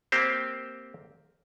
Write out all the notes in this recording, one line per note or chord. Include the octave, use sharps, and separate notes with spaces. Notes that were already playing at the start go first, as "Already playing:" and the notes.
A#3 C4 G4 C5